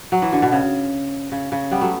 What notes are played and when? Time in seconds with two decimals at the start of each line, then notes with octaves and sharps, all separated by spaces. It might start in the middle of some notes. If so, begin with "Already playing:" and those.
0.12 F#3
0.22 E3
0.33 D3
0.42 B2
0.52 C#3
1.32 C#3
1.52 C#3
1.71 G3 B3
1.81 F#3 A3